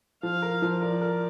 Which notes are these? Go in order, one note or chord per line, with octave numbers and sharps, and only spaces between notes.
F3 F5
A#4
F3
A#4 D5
A#4